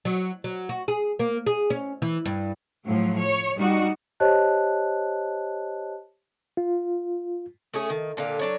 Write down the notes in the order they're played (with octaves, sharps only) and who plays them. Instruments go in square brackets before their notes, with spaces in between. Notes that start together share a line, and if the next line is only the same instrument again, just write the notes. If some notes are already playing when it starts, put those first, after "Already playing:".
[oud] F#3
F#3
F#4
G#4
A#3
G#4
C#4
E3
G2
[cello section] A2 F3 F#3
C#5
G3 D#4 F#4
[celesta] G4 C5 C#5 D#5 A5 F#6
[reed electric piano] F4
[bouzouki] A3 C#4 G#4
D#3
A#2 D3 G4 F5
F#3 D4 C#5